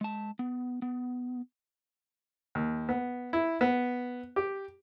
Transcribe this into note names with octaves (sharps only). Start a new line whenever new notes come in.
G#3 A5
B3
B3
D#2
B3
E4
B3
G4